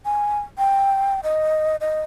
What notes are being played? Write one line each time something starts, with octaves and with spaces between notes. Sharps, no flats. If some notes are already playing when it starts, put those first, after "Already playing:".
G#5
G5
D#5
D#5